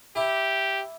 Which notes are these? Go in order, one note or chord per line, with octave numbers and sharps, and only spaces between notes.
E4 G4 D6